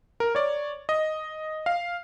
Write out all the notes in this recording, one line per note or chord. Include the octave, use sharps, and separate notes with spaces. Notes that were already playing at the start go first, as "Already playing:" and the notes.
A#4
C#5 D5
D#5
F5